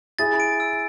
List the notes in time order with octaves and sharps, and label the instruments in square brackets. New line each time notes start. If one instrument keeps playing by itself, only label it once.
[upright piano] E4 G#4 [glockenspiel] A6
[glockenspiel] D7
E6